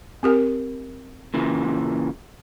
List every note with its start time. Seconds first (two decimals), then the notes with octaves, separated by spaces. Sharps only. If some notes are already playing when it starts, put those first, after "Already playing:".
0.23 C4 G4 A#4
1.34 A#2 C#3 E3